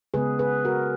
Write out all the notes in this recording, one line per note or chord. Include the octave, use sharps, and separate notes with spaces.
C#3 G#3 B3 G#4 B4
G#4 B4
F#4 A#4